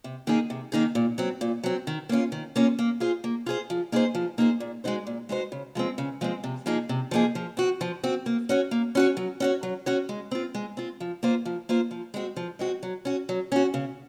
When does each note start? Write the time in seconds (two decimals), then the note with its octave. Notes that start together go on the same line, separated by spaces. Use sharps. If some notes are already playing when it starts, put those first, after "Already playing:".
0.04 C3
0.27 D#3 A#3 D#4 G#4
0.50 C3
0.72 D#3 A#3 D#4 G#4
0.95 A#2
1.18 F#3 C4
1.41 A#2
1.64 F#3 C4
1.87 D#3
2.09 A#3 C#4 F4
2.32 D#3
2.56 A#3 C#4 F4
2.79 A#3
3.00 F4 G#4 C5
3.24 A#3
3.46 F4 G#4 C5
3.70 F3
3.92 A#3 D#4 G#4 C5
4.15 F3
4.38 A#3 D#4 G#4 C5
4.60 A#2
4.84 G#3 D#4 F#4 C5
5.07 A#2
5.29 G#3 D#4 F#4 C5
5.52 C#3
5.75 F3 G#3 C4
5.98 C#3
6.21 F3 G#3 C4
6.44 C3
6.66 F3 A#3 D#4 G#4
6.89 C3
7.11 F3 A#3 D#4 G#4
7.35 F3
7.57 C4 F#4
7.81 F3
8.04 C4 F#4
8.26 A#3
8.49 C#4 F#4 C#5
8.71 A#3
8.95 C#4 F#4 C#5
9.17 F#3
9.40 C#4 F#4 C#5
9.63 F#3
9.86 C#4 F#4 C#5
10.09 G#3
10.31 C4 F4
10.55 G#3
10.77 C4 F4
11.00 F3
11.23 A#3 F4 C5
11.45 F3
11.69 A#3 F4 C5
11.91 F3
12.14 G#3 C4 F#4
12.36 F3
12.59 G#3 C4 F#4
12.83 F#3
13.05 C#4 F#4
13.29 F#3
13.52 C#4 F#4
13.74 C#3